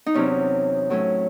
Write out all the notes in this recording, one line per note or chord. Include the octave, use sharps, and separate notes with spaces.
D#4
E2 C3 F#3 C4 C#4
A2 F#3 A3 C#4